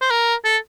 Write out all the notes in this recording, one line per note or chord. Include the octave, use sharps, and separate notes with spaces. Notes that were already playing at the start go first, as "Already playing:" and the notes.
C5
A#4
A4